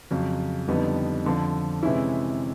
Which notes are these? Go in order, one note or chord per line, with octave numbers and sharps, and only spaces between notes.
F2 C#3 F#3
F2 D3 G3 B3 D#4
F2 D3 F3
C3 E3 G#3 C#4 E4